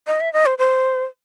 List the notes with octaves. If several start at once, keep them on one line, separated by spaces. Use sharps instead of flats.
D#5
E5
D#5
C5
C5